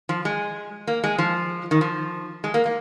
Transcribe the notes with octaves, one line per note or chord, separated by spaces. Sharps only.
F3
G#3
A#3
G#3
F3
D#3
F3
G#3
A#3
A#3